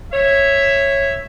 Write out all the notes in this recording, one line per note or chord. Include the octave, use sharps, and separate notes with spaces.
C#5 E5